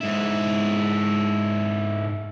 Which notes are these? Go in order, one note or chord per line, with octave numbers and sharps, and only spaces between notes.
G#2 E4